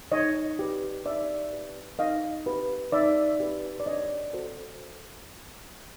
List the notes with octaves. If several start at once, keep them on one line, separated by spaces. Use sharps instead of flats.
D#4 C#5 D#5
G4 B4
D#4 D5 E5
G4 B4
D#4 D#5 F5
G4 B4
D#4 D5 E5
G4 B4
D5
D4 C#5 D#5
F#4 A4 C5